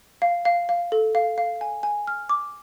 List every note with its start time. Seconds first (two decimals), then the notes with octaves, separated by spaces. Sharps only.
0.22 F5
0.45 F5
0.69 F5
0.92 A4
1.15 F5
1.38 F5
1.61 G#5
1.83 G#5
2.07 F6
2.29 D6